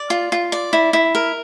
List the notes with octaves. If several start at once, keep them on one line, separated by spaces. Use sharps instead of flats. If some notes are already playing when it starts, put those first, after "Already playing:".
Already playing: D5
F4
F4
D5
E4
E4
A#4